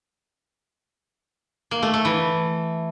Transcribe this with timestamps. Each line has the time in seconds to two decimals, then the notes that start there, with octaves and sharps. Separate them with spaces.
1.71 A#3
1.82 A3
1.94 A3
2.05 E3